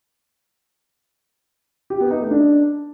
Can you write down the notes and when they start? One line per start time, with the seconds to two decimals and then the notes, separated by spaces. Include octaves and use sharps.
1.90 G4
2.00 B3
2.11 D#4
2.21 A3
2.31 D4